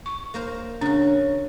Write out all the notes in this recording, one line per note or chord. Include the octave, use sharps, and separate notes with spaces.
C#6
A#3 A#4 C5
C#3 D4 F#4